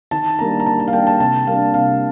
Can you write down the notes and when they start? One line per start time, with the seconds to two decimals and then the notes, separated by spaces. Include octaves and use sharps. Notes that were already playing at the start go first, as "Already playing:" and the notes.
0.11 D#3 A5
0.38 G3 A#3 D4 A#5
0.60 A#5
0.66 D#3 A5
0.80 A5
0.88 F5
0.93 G3 A#3 D4 G5
1.07 A5
1.19 C3 A5
1.47 G3 A#3 D4 F5
1.74 C3 F5